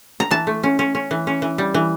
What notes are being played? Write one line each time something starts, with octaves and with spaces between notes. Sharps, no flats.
A#5
E3 A5
A3
C#4
C#4
C#4
E3
C#4
E3
G3
E3